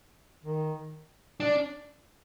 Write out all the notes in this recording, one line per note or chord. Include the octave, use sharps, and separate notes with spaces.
D#3
D4